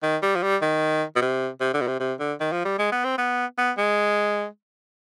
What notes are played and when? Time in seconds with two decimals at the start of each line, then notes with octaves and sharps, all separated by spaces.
0.03 D#3
0.22 G3
0.36 F3
0.43 G3
0.62 D#3
1.16 B2
1.22 C3
1.61 C3
1.74 D3
1.81 B2
1.87 C3
2.00 C3
2.20 D3
2.40 D#3
2.52 F3
2.65 G3
2.79 G#3
2.92 B3
3.05 C4
3.18 B3
3.58 B3
3.77 G#3